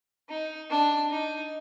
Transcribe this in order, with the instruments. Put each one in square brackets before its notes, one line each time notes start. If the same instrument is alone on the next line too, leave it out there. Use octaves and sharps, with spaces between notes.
[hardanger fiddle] D#4
D4
D#4